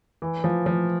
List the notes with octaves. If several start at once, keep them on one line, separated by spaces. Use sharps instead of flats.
E3
F3
F3